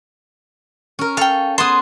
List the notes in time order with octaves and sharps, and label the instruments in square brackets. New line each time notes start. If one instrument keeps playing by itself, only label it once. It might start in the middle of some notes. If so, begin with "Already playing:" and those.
[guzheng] C#4 A#4
[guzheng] A4 [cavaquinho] F5 G5
[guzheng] B3 G#4 A5 [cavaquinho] C6 D#6